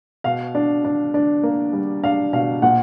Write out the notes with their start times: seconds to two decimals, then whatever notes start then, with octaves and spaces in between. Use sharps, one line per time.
0.24 B2 F5
0.55 D4
0.84 D4
1.14 D4
1.43 A#3
1.73 G3
2.03 D4 F5
2.33 B2 F5
2.62 A#2 F#5